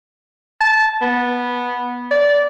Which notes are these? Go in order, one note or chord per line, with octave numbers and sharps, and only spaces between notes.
A5
B3
D5